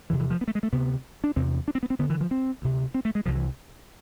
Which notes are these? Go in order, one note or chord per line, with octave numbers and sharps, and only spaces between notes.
E2 C3 E3
E3
F3
B3
A3
G#3
A3
D2 C3 B3
D4
E2 C3 C4
D4
C4
B3
C4
D2 D3 B3
E3
F3
C4
D2 C3
C4
A3
G#3
C2 C3 F3
E3